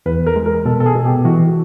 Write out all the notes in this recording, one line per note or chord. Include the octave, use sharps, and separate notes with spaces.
E2 B4
A#4
G#3
A#4
B2 A4
A4
G#4
B2
G4
E3 F#4